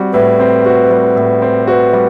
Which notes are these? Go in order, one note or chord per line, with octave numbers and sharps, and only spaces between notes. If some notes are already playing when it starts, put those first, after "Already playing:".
Already playing: G3 C4 F#4
A2 B4
C4
F#4
G3
A2
C4
F#4 B4 C5
G3